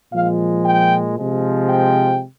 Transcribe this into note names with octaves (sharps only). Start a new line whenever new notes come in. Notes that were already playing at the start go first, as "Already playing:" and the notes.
A#2 F3 G#3 F5
G5
C3 F3 G#3
G5